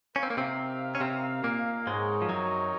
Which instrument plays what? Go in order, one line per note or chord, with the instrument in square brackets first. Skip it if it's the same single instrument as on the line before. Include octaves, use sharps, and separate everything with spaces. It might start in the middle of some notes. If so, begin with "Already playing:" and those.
[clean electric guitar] C#4 [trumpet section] D#4 A#4 F5
[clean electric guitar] C4
A#3
C3 C4
C#4
C3 C4
A#2 A#3
[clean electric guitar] G#2 G#3 [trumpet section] C4 D#4 A#4 C#5
[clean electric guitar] F3
F#2 F#3